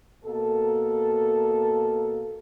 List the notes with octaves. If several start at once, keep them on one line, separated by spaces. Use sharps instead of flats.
B2 A#3 A4